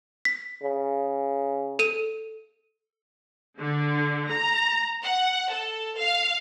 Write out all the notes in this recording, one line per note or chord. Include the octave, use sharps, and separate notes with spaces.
B6
C#3
A4 D#7
D3
A#5
F#5
A4
F5